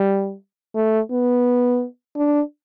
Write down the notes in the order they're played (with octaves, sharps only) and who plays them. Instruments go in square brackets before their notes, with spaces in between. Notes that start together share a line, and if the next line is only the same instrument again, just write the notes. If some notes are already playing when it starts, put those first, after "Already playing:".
Already playing: [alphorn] G3
A3
B3
D4